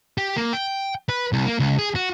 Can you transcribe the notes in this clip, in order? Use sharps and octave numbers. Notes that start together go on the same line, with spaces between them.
G4
A#3
G5
B4
C2
A#3
C#2
G#4
F#4